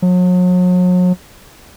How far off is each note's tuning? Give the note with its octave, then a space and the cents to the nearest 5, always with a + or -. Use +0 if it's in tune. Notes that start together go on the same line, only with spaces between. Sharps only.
F#3 -40